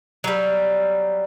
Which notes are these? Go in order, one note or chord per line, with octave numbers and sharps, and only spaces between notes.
F#3 G3